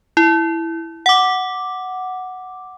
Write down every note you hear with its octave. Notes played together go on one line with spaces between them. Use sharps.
E4
F#5 D6